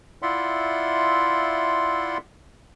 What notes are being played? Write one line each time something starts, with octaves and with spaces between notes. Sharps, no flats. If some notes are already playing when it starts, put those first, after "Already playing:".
E4 F4 D5 E5 F#5 C6